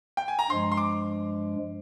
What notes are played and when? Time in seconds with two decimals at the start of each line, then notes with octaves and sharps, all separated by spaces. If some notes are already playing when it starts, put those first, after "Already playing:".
0.17 G5
0.28 G#5
0.39 A#5
0.50 G2 F3 G#3 C6
0.72 C6
0.77 D6